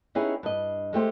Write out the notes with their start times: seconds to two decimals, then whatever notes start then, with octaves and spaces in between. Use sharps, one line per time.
0.15 B3 C#4 D#4 E4 G4 G#4
0.43 G2 D#5
0.93 G#3 A3 G4 C5